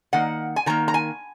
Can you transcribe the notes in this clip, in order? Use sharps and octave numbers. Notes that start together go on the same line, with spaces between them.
D#3 A#3 F#5
G#5
D#3 A#3 A#5
A#5
G#5